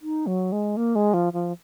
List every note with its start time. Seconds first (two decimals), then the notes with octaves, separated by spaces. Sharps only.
0.02 D#4
0.27 F#3
0.52 G#3
0.77 A#3
0.95 G#3
1.14 F3
1.33 F3